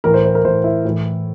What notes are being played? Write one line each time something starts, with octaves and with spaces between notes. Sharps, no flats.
A2 E3 A#4
C5
C5
A#4
A2 E3 C5
E4
A2 E3